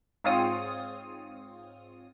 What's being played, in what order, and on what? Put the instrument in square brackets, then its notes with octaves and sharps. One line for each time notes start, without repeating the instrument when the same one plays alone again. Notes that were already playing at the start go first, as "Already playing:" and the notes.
[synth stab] G#2 C4 F4 C#5 D#6